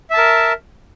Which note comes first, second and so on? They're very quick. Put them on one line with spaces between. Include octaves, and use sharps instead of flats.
E5 A5 A#4